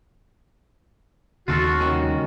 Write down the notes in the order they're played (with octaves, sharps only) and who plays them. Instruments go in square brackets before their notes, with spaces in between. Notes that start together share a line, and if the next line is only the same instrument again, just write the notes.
[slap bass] D#2 C#3 [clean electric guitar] F4 A4 [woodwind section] F#4
[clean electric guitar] C2 D#3 C#4